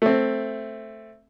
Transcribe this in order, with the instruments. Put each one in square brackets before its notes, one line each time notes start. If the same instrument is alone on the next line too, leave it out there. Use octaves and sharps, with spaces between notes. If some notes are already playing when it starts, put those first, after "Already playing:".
[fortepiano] A3 C4